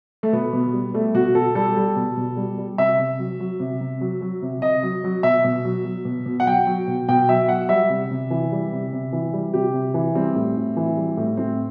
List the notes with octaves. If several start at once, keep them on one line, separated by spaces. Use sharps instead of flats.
A3
B2 B3
B2
G3
G3 A3
B2 F#4
B2 A4
G3 A4
G3
B2
B2
G3
G3
C3 E5
C3
F#3
F#3
C3
C3
F#3
F#3
C3
C3 D#5
F#3
F#3
B2 E5
B2
F#3
F#3
B2
B2
F#5
F#3 G5
F#3
B2
B2 G5
F#3 E5
F#3 F#5
G3 E5
C3
C3
E3
G3
C3
C3
E3
G3
C3 G4
C3
E3
G3 C4
A2
A2
E3
G3
A2
A2 C4